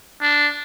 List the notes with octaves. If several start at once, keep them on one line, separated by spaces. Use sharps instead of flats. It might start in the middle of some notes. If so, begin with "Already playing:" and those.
D4